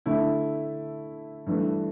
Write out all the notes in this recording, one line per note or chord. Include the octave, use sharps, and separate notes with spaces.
D3 A3 E4
G2 E3 A3